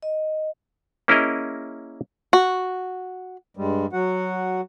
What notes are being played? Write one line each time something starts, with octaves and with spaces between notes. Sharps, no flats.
D#5
A#3 C#4 E4 G#4 A#4 D#5
F#4
G2 G3 G#3
F#3 F#4 F#5